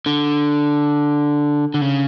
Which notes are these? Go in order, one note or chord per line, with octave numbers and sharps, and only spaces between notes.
D3
D3
C#3